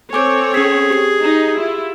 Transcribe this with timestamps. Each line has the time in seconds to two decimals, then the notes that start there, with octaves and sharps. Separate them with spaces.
0.13 C4 A4 C#5 G#5 D6 G6
0.54 C#4 G#4 B6
0.90 G4 C7
1.23 D#4
1.58 E4 F4